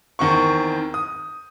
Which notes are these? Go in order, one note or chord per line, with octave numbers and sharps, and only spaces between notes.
E2 D#3 C4 C#6
D#6